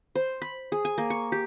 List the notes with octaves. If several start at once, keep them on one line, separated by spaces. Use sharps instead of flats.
C5
B5
G#4
G#5
A#3
C#6
G4